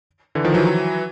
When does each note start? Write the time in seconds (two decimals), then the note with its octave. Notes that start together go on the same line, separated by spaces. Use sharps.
0.35 D3 E3
0.44 D#3 F3
0.54 E3 F#3